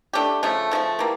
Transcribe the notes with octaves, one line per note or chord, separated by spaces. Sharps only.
A3 D4 G4
C#3 F3 A3
C#3 F3 A3
E3 G3 A#3